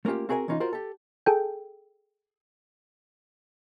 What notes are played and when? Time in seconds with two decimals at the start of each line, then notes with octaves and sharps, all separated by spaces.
0.05 A3 A#3 C#4 F4 G4
0.29 C4 F#4 G#4 A#4 E5 G#5
0.48 E3 C#4 D#4 F4
0.60 F4 F#4 A#4 C5
0.73 G4 A4
1.26 G#4 A4 G5